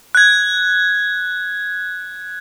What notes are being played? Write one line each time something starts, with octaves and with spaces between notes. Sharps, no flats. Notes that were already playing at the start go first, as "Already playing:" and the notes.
F#6 G#6